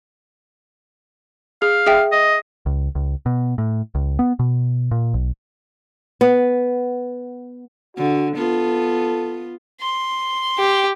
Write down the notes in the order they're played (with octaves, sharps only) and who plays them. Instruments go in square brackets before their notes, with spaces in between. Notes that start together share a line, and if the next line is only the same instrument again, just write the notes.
[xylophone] G#4 [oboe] F5
[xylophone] G#4 E5 G5
[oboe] D#5
[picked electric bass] C#2
C#2
B2
A2
C#2
B3
B2
A#2
B1
[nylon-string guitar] B3
[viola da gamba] D3 [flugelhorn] F#4
[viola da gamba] B3 F4 [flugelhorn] A4
[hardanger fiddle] C6
[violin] G4